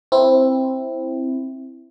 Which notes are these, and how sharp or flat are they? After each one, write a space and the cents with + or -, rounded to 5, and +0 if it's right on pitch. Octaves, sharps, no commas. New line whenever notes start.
C4 +5 E4 +0